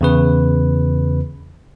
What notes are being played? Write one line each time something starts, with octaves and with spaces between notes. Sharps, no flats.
E2 C#3 B4